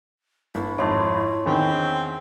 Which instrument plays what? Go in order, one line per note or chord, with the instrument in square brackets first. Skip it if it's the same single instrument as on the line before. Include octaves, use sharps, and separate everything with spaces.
[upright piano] G1 [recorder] E4
[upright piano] G#1 F2 [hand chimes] C#5 C6
[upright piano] E2 D3 D#3 [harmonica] C4